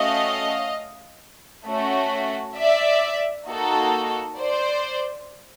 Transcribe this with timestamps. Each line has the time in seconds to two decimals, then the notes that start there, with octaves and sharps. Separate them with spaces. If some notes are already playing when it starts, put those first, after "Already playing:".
Already playing: A3 C#4 F#4 A4 D#5 F5
1.67 A3 C#4 F#4
2.58 D5 E5
3.49 A#3 D#4 F#4 A4
4.40 C5 D5